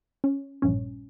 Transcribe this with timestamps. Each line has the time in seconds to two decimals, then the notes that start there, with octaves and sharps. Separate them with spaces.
0.24 C#4
0.62 A#1 G2 C#4